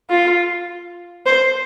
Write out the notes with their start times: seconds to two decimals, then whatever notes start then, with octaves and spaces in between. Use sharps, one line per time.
0.10 F4
1.26 C5